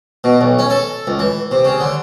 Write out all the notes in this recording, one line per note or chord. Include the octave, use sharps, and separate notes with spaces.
B2
B1
C#4
A4
C#2
E3
C3
C#3
D3